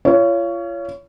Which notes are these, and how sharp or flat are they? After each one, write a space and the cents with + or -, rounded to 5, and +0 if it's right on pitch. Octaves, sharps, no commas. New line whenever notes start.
F4 -30 C#5 +20